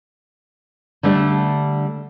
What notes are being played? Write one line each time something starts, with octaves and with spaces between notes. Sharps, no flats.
D3 G3 A3 D4